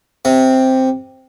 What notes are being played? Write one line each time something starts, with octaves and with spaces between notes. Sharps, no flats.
C3